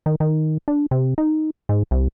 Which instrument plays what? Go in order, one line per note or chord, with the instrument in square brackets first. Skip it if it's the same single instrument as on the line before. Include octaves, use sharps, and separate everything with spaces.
[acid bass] D#3
D#3
D4
C3
D#4
G#2
C2